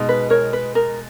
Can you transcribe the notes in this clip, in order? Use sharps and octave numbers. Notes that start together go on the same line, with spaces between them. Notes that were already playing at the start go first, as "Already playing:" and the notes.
Already playing: B2 G#3 D#4
B4
A#4 C#5
B4
A#4